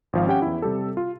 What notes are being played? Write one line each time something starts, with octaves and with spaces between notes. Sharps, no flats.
G#1 F3 F5
C#4 G4 F#5 G5
E2 E4
C3 G3 G4 A4
F4